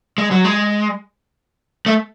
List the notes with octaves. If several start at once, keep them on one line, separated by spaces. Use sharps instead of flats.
G#3
F#3
G#3
A3